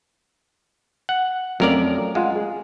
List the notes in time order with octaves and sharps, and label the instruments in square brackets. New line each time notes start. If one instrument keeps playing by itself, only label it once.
[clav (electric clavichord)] F#5
[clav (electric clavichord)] F2 A#4 D5 [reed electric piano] F#3 A3 C#4
[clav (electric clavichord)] G#3 [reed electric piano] F4 F5 F#5
[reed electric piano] G#4